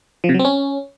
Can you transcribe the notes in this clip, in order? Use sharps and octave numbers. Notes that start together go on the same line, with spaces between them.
F3
C3
F#3
C4
C#4